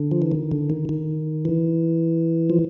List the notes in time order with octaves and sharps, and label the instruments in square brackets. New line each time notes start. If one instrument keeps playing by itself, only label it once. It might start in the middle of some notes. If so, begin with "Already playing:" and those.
Already playing: [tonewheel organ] D3
F3
E3
D#3
D3
D#3
D#3
E3
F3